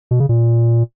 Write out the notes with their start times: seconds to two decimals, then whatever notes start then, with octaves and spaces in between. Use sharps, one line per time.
0.11 B2
0.20 C#3
0.29 A#2